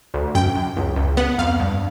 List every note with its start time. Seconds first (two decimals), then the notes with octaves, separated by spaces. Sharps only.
0.14 D2
0.35 F#2 G5
0.55 F#2
0.77 C#2
0.96 C#2
1.17 B3 F#5
1.38 F2 F5
1.60 G2